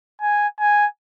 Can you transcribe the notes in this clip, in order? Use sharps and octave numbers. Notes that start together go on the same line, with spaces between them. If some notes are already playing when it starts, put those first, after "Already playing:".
G#5
G#5